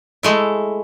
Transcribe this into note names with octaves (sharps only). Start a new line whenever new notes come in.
G#3 A3 E4